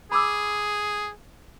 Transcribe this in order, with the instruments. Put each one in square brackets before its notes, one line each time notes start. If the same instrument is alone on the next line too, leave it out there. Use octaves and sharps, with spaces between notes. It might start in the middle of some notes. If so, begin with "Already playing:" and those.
[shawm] G#4 [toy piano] B5 D6 E6